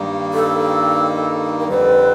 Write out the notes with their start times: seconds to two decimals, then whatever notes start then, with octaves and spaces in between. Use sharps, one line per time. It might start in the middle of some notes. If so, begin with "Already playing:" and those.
Already playing: G2 D#3 G3 A#3 D#4
0.34 A4
1.60 A#4
1.68 F2 D3 G3 C4 B4